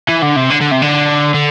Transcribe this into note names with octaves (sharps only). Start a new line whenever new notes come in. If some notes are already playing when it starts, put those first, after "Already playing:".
E3
D3
C3
D3
D3
C3
D3
D3